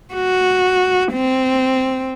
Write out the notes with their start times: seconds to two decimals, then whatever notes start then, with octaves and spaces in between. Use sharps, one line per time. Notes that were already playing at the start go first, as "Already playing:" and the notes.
0.14 F#4
1.13 C4